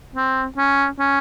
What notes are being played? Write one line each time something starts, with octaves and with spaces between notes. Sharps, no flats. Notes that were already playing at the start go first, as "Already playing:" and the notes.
C4
C#4
C#4